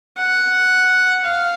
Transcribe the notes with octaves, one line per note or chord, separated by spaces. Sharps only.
F#5
F5